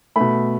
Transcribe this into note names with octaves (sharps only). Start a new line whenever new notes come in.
B2 A3 B5